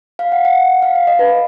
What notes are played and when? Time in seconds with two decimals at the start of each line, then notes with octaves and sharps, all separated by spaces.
0.19 F5
0.32 F#5
0.45 F#5
0.82 F5
0.95 F5
1.07 D#5
1.19 B4